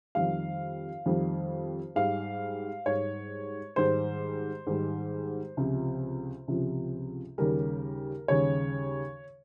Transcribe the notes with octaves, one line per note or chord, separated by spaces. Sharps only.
F2 D#3 G3 F5
F2 D#3 G3
G#2 G3 F5
G#2 G3 C#5
G#2 D#3 G3 C5
G#2 D#3 G3
C#2 C3 F3
C#2 C3 F3
D#2 C#3 G3 A#4
D#2 C#3 G3 C#5